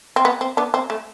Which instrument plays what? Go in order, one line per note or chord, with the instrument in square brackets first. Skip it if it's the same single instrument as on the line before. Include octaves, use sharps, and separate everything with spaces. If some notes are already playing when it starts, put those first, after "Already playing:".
[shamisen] C4
B3
C4
B3 D4
C4
A3